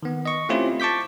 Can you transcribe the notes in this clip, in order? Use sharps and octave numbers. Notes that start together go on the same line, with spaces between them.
D#3 B3
D#5 C#6
A3 C4 C#4 E4 F4 G4
A5 C#6 D6 G6 B6